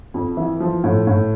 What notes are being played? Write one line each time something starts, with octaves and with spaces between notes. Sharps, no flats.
F2
E3
F3
A2
A2